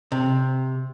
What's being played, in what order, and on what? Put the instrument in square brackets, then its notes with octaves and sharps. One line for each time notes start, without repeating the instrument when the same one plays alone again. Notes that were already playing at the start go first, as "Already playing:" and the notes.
[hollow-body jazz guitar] C3